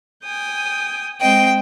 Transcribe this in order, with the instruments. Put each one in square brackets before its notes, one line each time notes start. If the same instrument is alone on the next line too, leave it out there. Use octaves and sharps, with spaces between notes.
[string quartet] G5 G#5 D#6
[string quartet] G#3 C4 D#5 [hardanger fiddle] G5